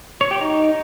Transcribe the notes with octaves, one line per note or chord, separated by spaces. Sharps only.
C#5
G4
D#4